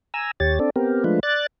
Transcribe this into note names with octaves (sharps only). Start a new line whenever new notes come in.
G#5 A#5 E6
D#2 G4 C#5 A6
C4 D4 A4 D5
B3 C4 G4 A#4
F3 G#3 A3 D4 F4 B4
D5 F#6 A6